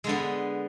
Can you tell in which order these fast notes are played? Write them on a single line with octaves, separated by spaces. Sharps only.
G#3 D3 B3